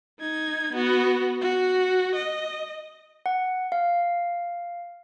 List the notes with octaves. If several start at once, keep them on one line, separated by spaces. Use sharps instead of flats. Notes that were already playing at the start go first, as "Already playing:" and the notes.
D#4 G#6
B3 F#4
F#4
D#5
F#5
F5